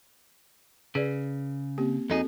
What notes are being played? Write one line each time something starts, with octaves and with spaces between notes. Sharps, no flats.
C#3 G#4 B4 D5
A#3 C4 G4
F2 C4 D#4 F#4 G#4 A4